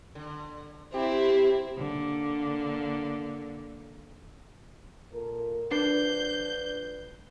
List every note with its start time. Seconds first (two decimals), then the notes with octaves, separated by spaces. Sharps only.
0.15 D3
0.94 C4 E4 G4
1.77 D3 A#3
5.12 A#2 A4 A#4
5.71 D3 F3 D4 B4 D5 G6 C7